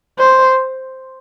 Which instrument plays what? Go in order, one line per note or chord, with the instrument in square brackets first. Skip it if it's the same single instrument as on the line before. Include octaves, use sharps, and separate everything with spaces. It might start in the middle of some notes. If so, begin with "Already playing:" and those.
[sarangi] C5